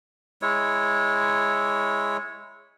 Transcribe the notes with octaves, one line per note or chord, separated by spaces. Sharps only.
G#3 E4 C#5